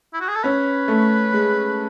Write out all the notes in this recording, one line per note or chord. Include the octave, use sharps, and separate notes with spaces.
E4
F#4
G#4
A4
C#4 B4
A3
G#3